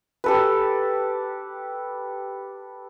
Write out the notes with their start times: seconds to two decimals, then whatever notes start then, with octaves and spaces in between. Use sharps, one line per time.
0.24 G4 A4 B4